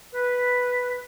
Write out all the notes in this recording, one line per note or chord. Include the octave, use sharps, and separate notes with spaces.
B4